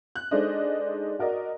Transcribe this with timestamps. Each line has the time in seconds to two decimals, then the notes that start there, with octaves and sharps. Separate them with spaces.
0.15 F#6
0.31 G#3 D4 D#4 A4 C5 D#5
1.19 F#4 A#4 D5 D#5